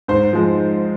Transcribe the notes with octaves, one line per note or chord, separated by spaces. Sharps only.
G#2 C5
F3 G#3